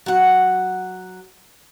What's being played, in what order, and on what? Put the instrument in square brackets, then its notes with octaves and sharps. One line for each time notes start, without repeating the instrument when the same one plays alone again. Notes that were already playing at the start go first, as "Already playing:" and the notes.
[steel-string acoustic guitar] F#3 F#5